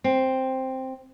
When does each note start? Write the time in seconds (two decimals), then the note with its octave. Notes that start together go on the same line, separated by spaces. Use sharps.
0.04 C4